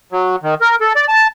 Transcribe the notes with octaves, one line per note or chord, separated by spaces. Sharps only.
F#3
D#3
A#4
A4
D5
A5